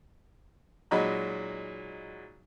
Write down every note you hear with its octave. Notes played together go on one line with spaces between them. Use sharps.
A#2 F#3 G#3 D#4 B5